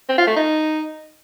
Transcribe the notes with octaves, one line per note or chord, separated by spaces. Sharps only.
C4
F4
A3
D#4